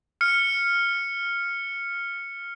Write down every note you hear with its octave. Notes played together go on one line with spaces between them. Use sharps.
F6 C#7